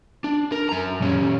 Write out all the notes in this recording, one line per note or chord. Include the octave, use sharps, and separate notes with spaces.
D4
A#4
F#2 A#5
A#2 C#4